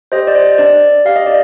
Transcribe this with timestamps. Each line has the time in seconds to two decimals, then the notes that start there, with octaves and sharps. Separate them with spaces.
0.12 G4 C5 D#5
0.27 D5
0.35 C5
0.58 D4 D5
1.05 G4 F5
1.16 D#5
1.26 D5